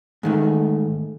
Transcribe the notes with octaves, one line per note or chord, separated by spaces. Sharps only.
G#2 D#3 A3